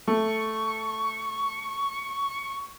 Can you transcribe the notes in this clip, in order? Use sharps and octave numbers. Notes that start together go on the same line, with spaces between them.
A3 C#6